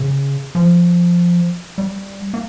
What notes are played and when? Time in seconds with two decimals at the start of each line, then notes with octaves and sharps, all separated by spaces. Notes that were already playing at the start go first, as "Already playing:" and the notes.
Already playing: C#3
0.55 F3
1.78 G3
2.34 A#3